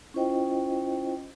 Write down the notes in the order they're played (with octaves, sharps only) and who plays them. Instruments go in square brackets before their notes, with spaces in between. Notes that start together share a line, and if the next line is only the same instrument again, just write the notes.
[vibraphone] C#4 E4 F4 C5 D#5 G5